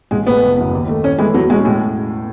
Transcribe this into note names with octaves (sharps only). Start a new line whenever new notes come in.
A1 G#3
A2 G#3 B3
F#1
F#2 E3 B3
D#2
D#3 A3
A2 C#4
E3 G#3 A3 E4
E2 F#3
B2 F#3 G#3 C#4
A2 G#3